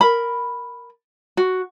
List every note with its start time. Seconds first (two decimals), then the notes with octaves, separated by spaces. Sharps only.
0.01 A#4 B5
1.37 F#4